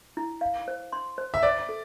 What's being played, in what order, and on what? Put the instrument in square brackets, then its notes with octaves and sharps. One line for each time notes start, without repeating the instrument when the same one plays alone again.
[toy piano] E4
F5
C5
C6
C5
[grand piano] E5
[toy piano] C5 [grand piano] D5
[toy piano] A4